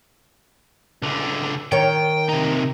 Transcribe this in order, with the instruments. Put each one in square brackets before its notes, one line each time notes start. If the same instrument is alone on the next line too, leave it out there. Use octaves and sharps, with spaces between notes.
[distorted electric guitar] C#2 D3
[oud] D#3 C#5 [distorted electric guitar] G5
[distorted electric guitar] C3 D#4